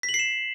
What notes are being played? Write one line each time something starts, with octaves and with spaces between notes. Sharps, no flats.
B6
F#7
C7
E7